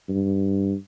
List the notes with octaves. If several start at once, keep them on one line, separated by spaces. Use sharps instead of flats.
G2